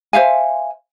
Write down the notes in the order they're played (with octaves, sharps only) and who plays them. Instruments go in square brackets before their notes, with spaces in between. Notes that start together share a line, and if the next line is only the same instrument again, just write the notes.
[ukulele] C5 E5 F5 G#5